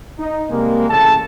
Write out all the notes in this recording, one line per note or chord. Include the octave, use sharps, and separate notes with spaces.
D#4
C3 G3 G#3 A#3
A1 C#3 A4 A5